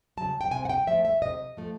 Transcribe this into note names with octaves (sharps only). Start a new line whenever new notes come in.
C#3 F#3 A5
G5
C3 G#5
F#5
G5
F3 A3 E5
E5
C3 D#5
F3 A3